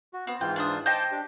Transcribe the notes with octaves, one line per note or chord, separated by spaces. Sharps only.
F#4
B3 C4
G#2 E3 F4 G5
D4 C5 D#6
C5 D#5 G5 A5 D6 G6
D4 G4